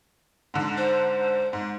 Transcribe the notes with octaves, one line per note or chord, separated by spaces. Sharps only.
G#2 D3
C5
G#2